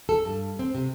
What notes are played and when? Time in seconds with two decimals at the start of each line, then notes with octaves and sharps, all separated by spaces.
0.09 A4
0.25 G2
0.59 C4
0.75 C3